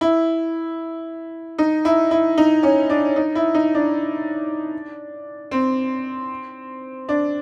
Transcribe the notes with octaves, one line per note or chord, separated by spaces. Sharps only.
E4
D#4
E4
E4
D#4
C#4
D4
D#4
E4
D#4
D4
C4
D4